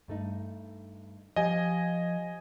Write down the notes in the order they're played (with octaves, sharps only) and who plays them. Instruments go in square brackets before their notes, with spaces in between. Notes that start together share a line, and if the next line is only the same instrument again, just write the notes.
[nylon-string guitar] G2 A3 D#4
[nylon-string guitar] F3 G4 F5 [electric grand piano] D#5 G#5